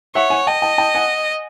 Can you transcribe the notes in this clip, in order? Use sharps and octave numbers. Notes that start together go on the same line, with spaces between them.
C#5 E5 F#5
F#5 G#5
D#5 G5 A5
G5 A5
G5 A5
F#5 G#5